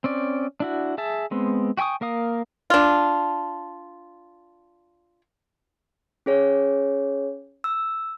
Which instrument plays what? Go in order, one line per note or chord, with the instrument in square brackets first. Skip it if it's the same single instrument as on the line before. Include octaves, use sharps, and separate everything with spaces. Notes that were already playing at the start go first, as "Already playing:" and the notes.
[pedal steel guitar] C4 C#4 D5
D4 E4 F#4
G#4 E5 A5
G#3 B3 C4
F#4 G5 G#5 C#6 D#6
A#3 A#4 F5 D#6
[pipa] D4 F4
[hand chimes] C#4 G#4 C#5
E6